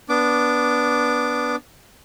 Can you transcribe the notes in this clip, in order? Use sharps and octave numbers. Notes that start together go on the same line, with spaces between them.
B3 D4 D6